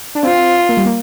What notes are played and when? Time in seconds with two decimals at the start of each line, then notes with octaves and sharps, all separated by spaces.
0.15 D4
0.23 C4 F4
0.69 A#3
0.77 G3
0.86 A#3